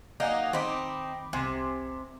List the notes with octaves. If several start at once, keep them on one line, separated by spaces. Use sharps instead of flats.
F#3 A#3 D#4 D5 G#5
D#3 C4 D#4 B5 D6
C2 C3 G#5 C6